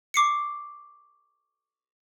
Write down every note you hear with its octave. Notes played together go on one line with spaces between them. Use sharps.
C#6 D6 C7 C#7